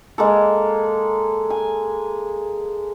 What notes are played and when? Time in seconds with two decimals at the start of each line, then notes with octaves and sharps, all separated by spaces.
0.18 G#3 A#3 A4
1.50 G#5